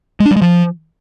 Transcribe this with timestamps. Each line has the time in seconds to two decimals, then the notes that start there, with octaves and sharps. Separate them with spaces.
0.20 G#3
0.25 D4
0.31 G3
0.36 G#3
0.42 F3